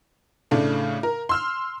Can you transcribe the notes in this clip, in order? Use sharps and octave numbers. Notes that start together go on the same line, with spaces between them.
A2 C#3 A3 D4
A#4
C6 E6 F6